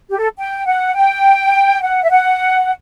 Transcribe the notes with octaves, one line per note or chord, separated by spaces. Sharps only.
G4
A4
G5
F#5
G5
F#5
E5
F#5